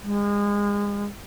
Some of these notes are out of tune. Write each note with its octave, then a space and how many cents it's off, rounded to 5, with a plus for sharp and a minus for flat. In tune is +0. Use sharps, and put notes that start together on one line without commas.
G#3 -30